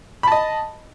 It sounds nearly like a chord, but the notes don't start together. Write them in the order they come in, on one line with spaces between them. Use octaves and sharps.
B5 A5 D#5